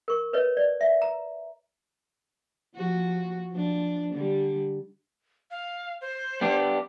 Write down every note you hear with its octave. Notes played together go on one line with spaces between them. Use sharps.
A#4 C#6
B4 C#5 D#5
D5
E5
A#5
F3 F#4
F3 D4
D3 G3
F5
C5
B3 D4 G4